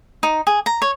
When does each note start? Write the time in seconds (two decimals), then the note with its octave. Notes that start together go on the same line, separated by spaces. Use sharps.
0.23 D#4
0.47 G#4
0.66 A#5
0.82 C#5